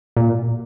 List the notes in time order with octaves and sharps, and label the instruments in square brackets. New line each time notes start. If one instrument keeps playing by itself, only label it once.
[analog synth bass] A#2